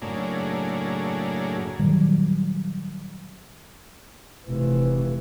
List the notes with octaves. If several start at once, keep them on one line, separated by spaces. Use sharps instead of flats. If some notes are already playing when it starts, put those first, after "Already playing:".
F#2 A2 C#3 A#3 D4 G#4
A#2 D#3 F#3 G3
F1 E3